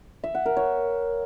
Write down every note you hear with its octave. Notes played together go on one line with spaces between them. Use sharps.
E5
F#5
A#4
C#5